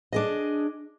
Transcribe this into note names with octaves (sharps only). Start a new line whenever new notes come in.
D4 G#4 D#5